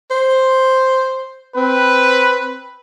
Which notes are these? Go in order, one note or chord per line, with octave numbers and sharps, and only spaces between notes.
C5
C4 B4